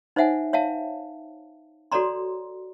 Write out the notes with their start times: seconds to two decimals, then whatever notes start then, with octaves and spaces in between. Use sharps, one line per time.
0.16 D#4 C5 C#5 E5 F#5 G#5
0.53 C#5 E5 F5 A5
1.92 F#4 A4 C#5 D5 A#5 C6